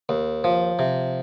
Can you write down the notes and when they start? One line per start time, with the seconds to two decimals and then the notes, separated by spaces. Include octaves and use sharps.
0.09 D#2
0.44 F3
0.79 C3